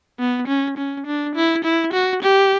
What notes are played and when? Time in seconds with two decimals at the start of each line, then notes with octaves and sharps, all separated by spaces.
0.20 B3
0.48 C#4
0.78 C#4
1.07 D4
1.36 E4
1.64 E4
1.93 F#4
2.23 G4